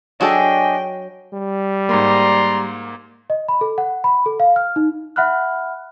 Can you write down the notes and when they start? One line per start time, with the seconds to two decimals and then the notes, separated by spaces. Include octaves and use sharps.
0.21 F#3 D4 F#4 G#4 A4 D#5 G5 G#5
1.33 G3
1.89 G#2 A#3 D5 A#5 C6
3.30 D#5
3.48 B5
3.61 A4
3.78 F#5
4.04 B5
4.26 A4
4.40 F5
4.56 F6
4.76 D#4
5.16 E5 F#5 B5 F6 F#6